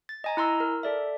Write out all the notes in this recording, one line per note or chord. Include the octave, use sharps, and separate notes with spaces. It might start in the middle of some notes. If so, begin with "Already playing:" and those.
A6
D#5 G#5 A#5
E4 A#5 C6 E6
A#4
A4 D5 E5